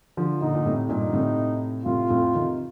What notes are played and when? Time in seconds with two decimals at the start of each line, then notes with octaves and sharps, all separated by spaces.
0.17 D3 F3
0.41 A#2 D3 D#4
0.55 A#2
0.65 A2 C3
0.89 G2 A#2 D#4
1.09 D3
1.14 A2 C3
1.86 A2 C3 F4
2.10 F2 A2
2.35 C3 D#3